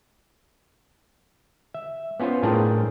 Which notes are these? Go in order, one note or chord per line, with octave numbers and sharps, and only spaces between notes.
E5
B3 C#4 F4 B4 C5
A2 D4 G#4 A#4 G5